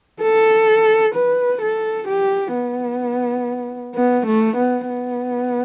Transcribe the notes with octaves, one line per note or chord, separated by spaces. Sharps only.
A4
B4
A4
G4
B3
B3
A3
B3
B3